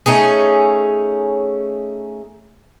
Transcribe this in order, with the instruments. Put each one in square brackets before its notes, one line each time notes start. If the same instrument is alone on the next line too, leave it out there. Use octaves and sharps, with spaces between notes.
[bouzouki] A3 C#4 D#4 G#4